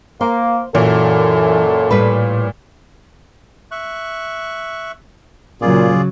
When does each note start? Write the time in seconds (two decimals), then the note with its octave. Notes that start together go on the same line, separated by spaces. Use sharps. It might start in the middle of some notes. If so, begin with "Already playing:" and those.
0.21 A#3 C5
0.75 F#2 A#2 E3 A4
1.91 A2 G3 B4
3.71 E5 C#6 F#6
5.61 A#2 C#3 F#3 F4 G#4 D5